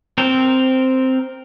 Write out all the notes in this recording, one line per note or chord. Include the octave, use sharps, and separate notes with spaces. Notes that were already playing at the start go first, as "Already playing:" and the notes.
C4 A#4 C5